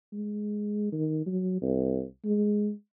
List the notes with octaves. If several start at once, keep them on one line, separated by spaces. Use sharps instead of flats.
G#3
D#3
F#3
C2
G#3